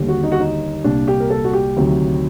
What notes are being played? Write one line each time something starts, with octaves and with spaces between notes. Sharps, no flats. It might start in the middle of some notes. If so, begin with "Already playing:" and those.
Already playing: D#2 D3 G3
F#4
D#4
F#4
D#4
C2 A#2 G3 D4
G4
A#4
A4
F#4
G4
D2 C3 D#3 F#3